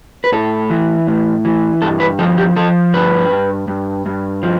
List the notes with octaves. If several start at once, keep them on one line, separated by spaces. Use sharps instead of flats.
B4
A2 A4
E3
A2
E3
G2 A4
B4
F3 A4
G4
F3 A4
G2 B4
G2
G2
G2
F3